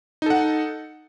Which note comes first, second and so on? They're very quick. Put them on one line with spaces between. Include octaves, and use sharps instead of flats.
D#4 A4 F#5